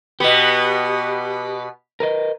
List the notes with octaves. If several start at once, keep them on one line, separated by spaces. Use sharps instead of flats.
B2 B3 G4
A#4 B4 D#5